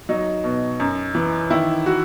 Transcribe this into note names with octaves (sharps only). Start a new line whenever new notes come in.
F#3 D#4
B2
F#2
E3
D#3 E4
F#4